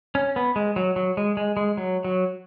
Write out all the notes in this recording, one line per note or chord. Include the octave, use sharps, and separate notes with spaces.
C#4
B3
G#3
F#3
F#3
G#3
G#3
G#3
F#3
F#3